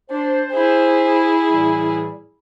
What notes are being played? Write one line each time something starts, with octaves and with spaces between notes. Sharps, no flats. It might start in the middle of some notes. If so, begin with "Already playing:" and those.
D4 C5
E4 G#4
A2 E3 G3